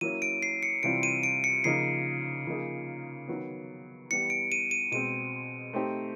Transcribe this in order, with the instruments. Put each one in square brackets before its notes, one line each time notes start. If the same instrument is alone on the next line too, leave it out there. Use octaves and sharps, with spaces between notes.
[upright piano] F#3 A#3 C#4 E4 [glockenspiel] D#7
[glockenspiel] D7
C7
C#7
[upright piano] C3 E3 G3 C4 F4 [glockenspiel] D7
[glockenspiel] D#7
D7
C#7
[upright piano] C#3 F3 A#3 D#4 [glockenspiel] C7
[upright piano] C#3 F3 A#3 D#4 G#4
D#3 F#3 B3
[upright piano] E3 G3 B3 E4 G4 [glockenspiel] C#7
[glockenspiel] D7
D#7
D#7
[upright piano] B2 G#3 C4 [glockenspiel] D#7
[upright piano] A3 C4 D#4 G4 C5